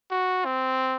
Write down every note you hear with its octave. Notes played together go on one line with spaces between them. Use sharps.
F#4
C4